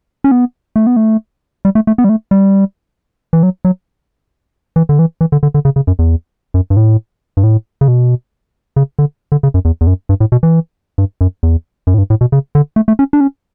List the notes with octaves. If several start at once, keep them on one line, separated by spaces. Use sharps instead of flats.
C#4
B3
A3
B3
A3
G3
A3
A3
B3
G3
A3
G3
E3
F#3
F#3
E3
D3
E3
E3
D3
D3
D3
C#3
C#3
F#2
E2
F#2
G2
A2
G2
A2
C#3
B2
C#3
D3
D3
C#3
F#2
E2
E2
F#2
G2
A2
B2
E3
G2
F#2
E2
F#2
A2
G2
A2
B2
C#3
D3
A3
A3
C#4
D4
C#4